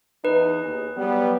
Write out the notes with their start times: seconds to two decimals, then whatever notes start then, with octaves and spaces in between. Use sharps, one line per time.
0.25 E2 D#4 B4
0.64 D#2 G#4
0.95 F#3 G3 B3